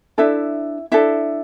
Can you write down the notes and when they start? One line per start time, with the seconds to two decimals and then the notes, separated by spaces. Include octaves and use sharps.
0.18 D4 E4 A4 E5
0.92 D4 E4 A4 E5